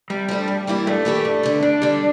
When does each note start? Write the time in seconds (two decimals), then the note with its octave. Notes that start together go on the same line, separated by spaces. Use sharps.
0.10 C3 G3
0.28 F3 A3 D4
0.48 G2
0.67 E3 A#3 E4 G4
0.87 G2 A3
1.05 E3 A#3 E4 G4
1.25 G2
1.43 D3 G3
1.62 G2 D4
1.82 D3 G3